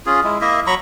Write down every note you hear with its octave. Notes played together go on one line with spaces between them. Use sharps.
C#4 F4 G#4
G#3 E4
A#3 E4 D#5 E5
F#3 A#5 B5 C#6